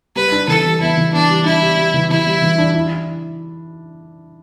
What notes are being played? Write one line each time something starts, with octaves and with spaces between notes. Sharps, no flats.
G3 B4
D4
E3 A4
G3
B3 E4
E3
B3 D4
G3
D4 E4
G3
G3
E3
E3 E4
G3
E3
D4
E4